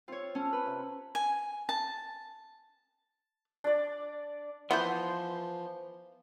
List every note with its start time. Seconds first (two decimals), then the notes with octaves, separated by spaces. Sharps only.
0.08 C4 F4 C#5
0.35 C#4 A4
0.53 B4
0.66 C3 A#4
1.15 G#5
1.69 A5
3.64 D4 D5
4.71 E3 F3 B3 C5 F#5 C6